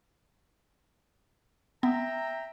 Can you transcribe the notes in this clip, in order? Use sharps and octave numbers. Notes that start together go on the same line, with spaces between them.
B3 E5 G5 A#5